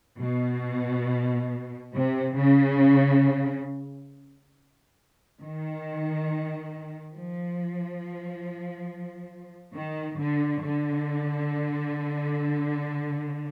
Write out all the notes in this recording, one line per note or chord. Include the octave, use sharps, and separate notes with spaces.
B2
C3
C#3
D#3
F3
D#3
D3
D3